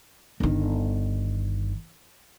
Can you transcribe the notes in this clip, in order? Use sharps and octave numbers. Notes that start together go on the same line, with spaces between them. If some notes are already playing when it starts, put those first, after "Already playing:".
G1 D#3